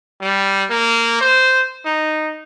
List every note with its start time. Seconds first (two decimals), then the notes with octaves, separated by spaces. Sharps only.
0.21 G3
0.70 A#3
1.21 C5
1.85 D#4